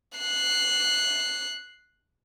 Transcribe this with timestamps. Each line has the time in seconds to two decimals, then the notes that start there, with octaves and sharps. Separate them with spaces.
0.18 F#6 C7